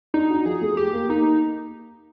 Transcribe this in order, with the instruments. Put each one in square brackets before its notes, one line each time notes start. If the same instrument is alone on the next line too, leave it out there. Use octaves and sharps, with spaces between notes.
[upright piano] D4 [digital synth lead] D#4
[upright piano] F#4
[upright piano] F3 [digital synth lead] G#4
[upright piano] A3
[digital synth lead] G4 [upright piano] G#4
[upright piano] A#3
[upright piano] A#3 [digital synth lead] D#4